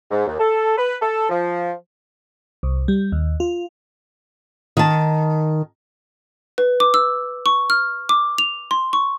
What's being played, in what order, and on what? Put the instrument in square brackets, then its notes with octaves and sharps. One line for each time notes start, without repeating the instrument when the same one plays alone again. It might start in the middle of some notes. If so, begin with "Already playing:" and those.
[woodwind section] G#2
D#2
A4
B4
A4
F3
[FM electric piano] C2
G3
D#2
F4
[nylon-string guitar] D#3 A5
[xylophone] B4
D6
E6
C#6
F6
D6
F7
C6
C#6